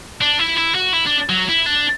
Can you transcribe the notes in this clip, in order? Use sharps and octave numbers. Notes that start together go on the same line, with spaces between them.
D4
E4
E4
F#4
E4
D4
F#3
E4
D4